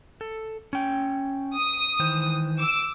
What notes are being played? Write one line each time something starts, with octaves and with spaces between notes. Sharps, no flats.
A4
C#4 G5
D#6
D#3 E3 C5
D6 E6